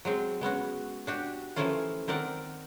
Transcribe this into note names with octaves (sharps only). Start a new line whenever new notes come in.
F#3 G#3 C4
G#3 B3 C#4 F#4
D4 F#4 G4
E3 F3 A3 A#3 C#4 F4
D#3 C4 A#4 D5 F#5